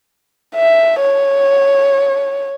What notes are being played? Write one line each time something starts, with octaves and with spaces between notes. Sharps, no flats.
E5
C#5